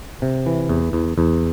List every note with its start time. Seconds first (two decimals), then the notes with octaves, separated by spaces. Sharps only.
0.22 C3
0.46 E3
0.69 E2
0.93 E2
1.18 E2